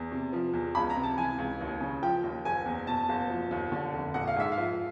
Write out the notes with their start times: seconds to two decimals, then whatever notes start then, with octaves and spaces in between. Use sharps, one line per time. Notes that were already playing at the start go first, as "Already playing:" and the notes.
Already playing: E2
0.12 C3
0.33 F3
0.54 E2
0.75 C#2 B5
0.90 A#5
0.96 C3
1.03 A5
1.18 E3 G#5
1.38 C#2
1.61 D#2
1.81 C#3
2.02 F3 G5
2.23 D#2
2.45 F#1 G#5
2.66 E2
2.87 B2 A5
3.09 F#1
3.30 F3
3.51 D#2
3.72 D3
3.94 F1
4.14 A#1 F#5
4.27 F5
4.36 G#2 E5
4.52 F5
4.58 F3